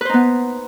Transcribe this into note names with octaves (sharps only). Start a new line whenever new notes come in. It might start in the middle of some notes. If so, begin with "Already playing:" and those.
B3 D#4 B4 C5